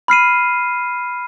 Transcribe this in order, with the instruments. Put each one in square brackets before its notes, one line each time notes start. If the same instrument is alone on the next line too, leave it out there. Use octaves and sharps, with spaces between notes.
[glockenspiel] B5 F6 C7 D#7